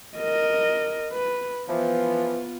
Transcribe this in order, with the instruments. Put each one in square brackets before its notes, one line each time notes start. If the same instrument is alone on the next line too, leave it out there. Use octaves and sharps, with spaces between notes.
[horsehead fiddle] A#4 D#5
B4
[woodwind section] E3 F3 [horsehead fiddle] B3 F4